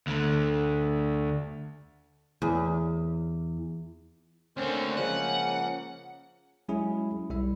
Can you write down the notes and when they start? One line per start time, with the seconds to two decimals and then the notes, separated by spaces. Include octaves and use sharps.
0.07 D2 D3
2.42 E2
4.57 D2 D3 A#3 C4 C#4 C5
4.97 C#3 F3 G#3 F#5
6.69 F#3 G#3 C#4 E4 G#4
7.30 B1 G3 E4 E5